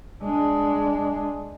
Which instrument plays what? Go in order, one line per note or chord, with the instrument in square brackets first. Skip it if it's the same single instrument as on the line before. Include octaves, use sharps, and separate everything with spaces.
[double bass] G#3 D4